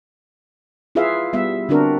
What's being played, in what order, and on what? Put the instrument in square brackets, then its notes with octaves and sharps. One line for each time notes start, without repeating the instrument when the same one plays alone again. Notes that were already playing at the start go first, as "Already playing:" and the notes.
[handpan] E4 F4 G#4 B4 E5 F5
G3 B3 E5
D3 C4 D4 F#4 A#4